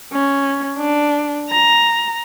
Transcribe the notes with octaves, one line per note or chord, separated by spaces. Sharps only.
C#4
D4
A#5